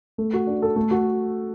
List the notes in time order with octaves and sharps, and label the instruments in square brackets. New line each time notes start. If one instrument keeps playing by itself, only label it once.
[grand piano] A3
F#4
D4
A4
A3
F#4